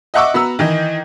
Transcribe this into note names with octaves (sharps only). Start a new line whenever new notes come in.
D#5 E5 F#5 C#6 D6 E6
B3 F#4 A#5 E6
D#3 E3 D#5